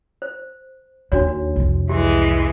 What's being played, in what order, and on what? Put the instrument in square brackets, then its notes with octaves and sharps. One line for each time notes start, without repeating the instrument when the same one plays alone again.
[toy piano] C5
[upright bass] D#2 [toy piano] D4 F#4 C#5
[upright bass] C2 F2
[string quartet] E3 G#3 [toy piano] G4